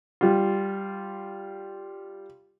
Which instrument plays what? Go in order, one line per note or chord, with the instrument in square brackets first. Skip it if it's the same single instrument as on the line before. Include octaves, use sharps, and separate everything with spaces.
[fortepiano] G3 F4